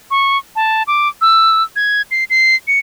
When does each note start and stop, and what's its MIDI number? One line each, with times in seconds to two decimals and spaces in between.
0.11 0.38 85
0.56 0.83 81
0.87 1.08 86
1.21 1.63 88
1.76 2.02 92
2.11 2.24 96
2.30 2.56 96
2.68 2.79 97